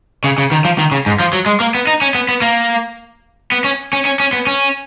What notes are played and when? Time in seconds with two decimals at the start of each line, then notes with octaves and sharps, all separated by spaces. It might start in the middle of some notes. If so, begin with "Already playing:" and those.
0.24 C#3
0.38 C#3
0.52 D#3
0.65 F3
0.78 D#3
0.92 C#3
1.06 G#2
1.20 F3
1.33 F#3
1.46 G#3
1.60 A#3
1.75 B3
1.87 D#4
2.02 C#4
2.15 B3
2.29 B3
2.42 A#3
3.52 B3
3.64 C#4
3.93 C#4
4.05 C#4
4.20 C#4
4.33 B3
4.47 C#4